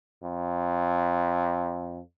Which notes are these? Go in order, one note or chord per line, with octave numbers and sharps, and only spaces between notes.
F2